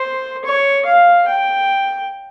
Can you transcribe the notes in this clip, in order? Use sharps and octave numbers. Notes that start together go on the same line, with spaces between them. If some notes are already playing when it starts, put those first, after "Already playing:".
Already playing: C5
C#5
F5
G5